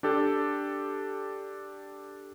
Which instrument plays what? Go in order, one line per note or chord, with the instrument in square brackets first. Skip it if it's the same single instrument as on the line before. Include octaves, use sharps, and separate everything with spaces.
[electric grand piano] D4 G4 A4 D5